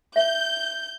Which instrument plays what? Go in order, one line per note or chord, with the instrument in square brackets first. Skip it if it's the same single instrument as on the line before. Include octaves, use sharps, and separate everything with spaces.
[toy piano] E5 [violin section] G6